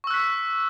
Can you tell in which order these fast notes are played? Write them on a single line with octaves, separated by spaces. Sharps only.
C#6 E6 F#6 B6